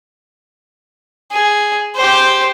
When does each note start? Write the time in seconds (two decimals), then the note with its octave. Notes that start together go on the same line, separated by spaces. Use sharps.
1.31 G#4
1.95 G4 C5